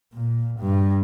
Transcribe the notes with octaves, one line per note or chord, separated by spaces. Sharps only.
A#2
G2